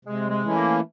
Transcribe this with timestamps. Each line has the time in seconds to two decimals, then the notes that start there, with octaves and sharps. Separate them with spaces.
0.05 C3 G#3
0.30 G#3
0.43 E3 A3 C#4 E4
0.56 A#3